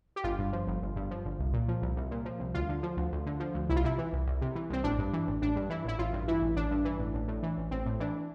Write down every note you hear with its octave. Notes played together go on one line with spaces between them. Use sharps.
G4
G1 F4
G2
F3
G1
G1
G2
F3
G1
C2
A#2
F3
C2
C2
A#2
F3
C2
D2 F4
D3
F3
D2
D2
D3
F3
D2
C2 E4
F4
C3 E4
E3
C2
C2
C3
E3
C2 C4
A1 D4
G2
E3
A1
A1 D4
G2
E3 E4
A1 E4
A1 F4
G2
E3 E4
A1
A1 D4
G2
E3
A1
A1
A2
E3
A1
A1 C4
A2
E3 D4